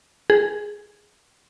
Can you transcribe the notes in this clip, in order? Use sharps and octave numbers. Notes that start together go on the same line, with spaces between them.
G#4